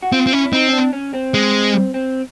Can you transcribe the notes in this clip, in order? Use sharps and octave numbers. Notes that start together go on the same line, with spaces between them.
F#4
C4 F4
C4
C#4 E4
C4 D#4
C#4
D4
C#4
C4
G#3
C4